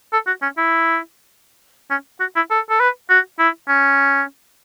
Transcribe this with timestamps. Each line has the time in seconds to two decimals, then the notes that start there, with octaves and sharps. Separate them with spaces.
0.13 A4
0.27 F#4
0.42 C#4
0.58 E4
1.91 C#4
2.20 F#4
2.36 E4
2.51 A4
2.70 A4
2.80 B4
3.10 F#4
3.39 E4
3.69 C#4